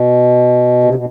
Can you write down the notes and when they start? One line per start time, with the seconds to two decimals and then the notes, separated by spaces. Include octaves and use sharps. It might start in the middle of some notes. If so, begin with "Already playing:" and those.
Already playing: B2
0.84 C3
0.95 B2